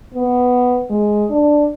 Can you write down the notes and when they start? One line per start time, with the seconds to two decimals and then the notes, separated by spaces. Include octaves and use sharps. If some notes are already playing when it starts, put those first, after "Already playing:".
0.14 B3
0.90 G#3
1.30 D4